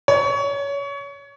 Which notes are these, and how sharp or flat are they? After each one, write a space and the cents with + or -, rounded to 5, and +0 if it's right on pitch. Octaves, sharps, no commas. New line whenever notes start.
C#5 +25